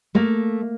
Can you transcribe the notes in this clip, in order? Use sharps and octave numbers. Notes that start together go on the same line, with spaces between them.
A3 A#3